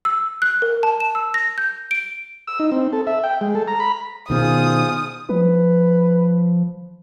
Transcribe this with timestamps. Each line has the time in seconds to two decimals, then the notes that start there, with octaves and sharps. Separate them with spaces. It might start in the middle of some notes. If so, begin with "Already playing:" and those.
0.05 E6
0.42 F#6
0.62 A#4
0.83 A5
1.00 E7
1.15 E6
1.34 A#6
1.58 G6
1.91 D7
2.47 E6
2.60 D#4
2.72 C4
2.93 A4
3.07 E5
3.24 G5
3.41 G#3
3.55 A4
3.68 A#5
3.80 B5
4.30 B2 D#3 F4 G#4 C5 D#6
5.29 F3 B4